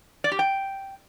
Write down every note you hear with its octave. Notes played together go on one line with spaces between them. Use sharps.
D5
G4
G5